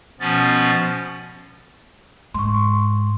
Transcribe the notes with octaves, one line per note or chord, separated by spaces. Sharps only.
B2 F3 B3 C#4 A6
G#2 C6 C#6